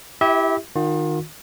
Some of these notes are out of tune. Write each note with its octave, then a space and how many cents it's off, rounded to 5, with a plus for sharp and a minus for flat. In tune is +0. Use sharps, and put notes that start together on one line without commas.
E4 +0 G4 +0 E5 -35
D#3 -10 F4 +40